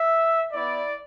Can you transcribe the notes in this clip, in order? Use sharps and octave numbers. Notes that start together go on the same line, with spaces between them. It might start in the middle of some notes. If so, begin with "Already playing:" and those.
Already playing: E5
B3 E4 D5